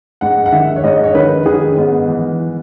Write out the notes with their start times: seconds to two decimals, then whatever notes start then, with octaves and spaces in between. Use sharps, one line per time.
0.21 G#2 F#5
0.46 F#5
0.52 D#3 E5
0.76 C#5
0.84 G#2 D#5
1.04 C#5
1.15 D#3 B4
1.46 D#3 G#4
1.67 C#4
1.77 G#2 B3
2.08 E3
2.40 E3